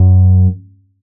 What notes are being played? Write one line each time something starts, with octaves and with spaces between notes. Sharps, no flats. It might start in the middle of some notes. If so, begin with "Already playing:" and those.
Already playing: F#2